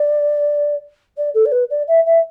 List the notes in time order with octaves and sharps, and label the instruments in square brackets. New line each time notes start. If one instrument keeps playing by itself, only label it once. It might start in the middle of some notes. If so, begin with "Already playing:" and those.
Already playing: [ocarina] D5
D5
A4
D5
B4
D5
E5
E5